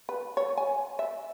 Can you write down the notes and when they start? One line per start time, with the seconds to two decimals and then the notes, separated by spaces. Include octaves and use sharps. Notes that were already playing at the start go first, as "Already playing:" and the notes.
0.09 B4
0.37 C#5
0.57 G#5
0.99 E5